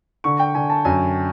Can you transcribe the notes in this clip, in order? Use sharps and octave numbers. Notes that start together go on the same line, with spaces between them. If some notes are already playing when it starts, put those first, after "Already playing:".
D3 C#6
G5
D3 G#5
A5
F#2 G#5